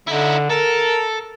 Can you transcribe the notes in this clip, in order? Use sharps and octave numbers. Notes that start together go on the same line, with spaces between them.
D3 D#4 E4
A4 A#4